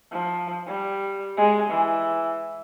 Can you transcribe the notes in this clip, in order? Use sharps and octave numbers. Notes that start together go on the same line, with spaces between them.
F3
G3
G#3
E3